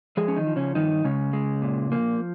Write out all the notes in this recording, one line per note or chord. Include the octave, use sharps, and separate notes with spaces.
F3 G#3 G#4
C#4
D#3 D#4
F3
C#3 C#4
G2 D#3 D#4
C#3 G#3 C#4
G#3
A#2
F3 A#3